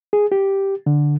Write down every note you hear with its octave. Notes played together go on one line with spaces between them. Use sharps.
G#4
G4
D3